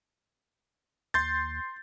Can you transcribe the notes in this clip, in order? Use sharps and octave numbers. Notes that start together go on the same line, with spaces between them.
D#2 C6 G6 A6